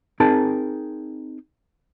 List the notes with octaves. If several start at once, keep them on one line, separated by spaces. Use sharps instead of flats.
C4 D#4 G#4 A#4 A5